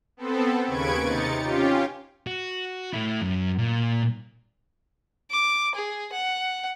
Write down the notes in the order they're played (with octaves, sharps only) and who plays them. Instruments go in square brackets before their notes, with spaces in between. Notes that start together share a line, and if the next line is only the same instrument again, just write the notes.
[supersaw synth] B3 C4 A4
D#2 C#3 B4 C#6 G#6 D7
C3 D#4 A6 C#7
C#4 F4 G4
[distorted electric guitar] F#4
A3 E4
F#2
A#2
[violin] D6
G#4
F#5